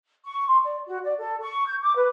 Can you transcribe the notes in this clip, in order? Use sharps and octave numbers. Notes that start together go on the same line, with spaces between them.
C#6
C6
D5
F#4
D5
A4
C#6
G6
D6
B4